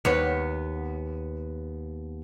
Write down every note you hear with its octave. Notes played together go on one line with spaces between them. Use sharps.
D#2 B3 C#5